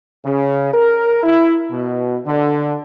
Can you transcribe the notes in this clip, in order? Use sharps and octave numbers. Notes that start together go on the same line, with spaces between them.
C#3
A#4
E4
B2
D3